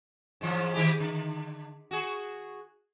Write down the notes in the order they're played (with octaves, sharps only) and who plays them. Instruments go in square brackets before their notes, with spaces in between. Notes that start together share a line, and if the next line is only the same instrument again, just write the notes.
[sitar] G#2 E3 F3
D#3 G#3 G4
D3
F#4 G#4